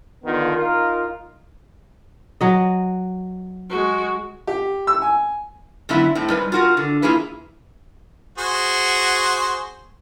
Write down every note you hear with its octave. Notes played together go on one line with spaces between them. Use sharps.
D3 D#3 B3 F4
D#4 F4 A#4
F#3 D#5
G#3 F#4
G4
E6
G#5
F#2 D3 B3 E4 E5
A2 C4
G#2 G3 B4
F4 F#4 A#4
D3
A#3 E4 F4 G#4 B4
F#4 G#4 C5